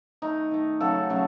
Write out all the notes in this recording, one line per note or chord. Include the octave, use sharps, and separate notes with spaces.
D#3 A3 D#4
D#3 A3
C#3 F#3 A3 A4
C#3 F#3 A3